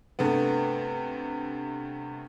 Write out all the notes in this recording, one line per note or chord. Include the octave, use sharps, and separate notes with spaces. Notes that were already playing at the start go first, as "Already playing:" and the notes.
G2 C3 A3 B3